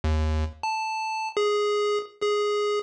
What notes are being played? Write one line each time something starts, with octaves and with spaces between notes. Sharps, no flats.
D#2
A5
G#4
G#4